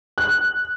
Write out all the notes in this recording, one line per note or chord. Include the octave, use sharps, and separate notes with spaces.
F#6